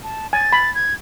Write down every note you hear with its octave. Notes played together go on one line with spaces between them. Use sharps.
A5
G#5 A6
B5
G#6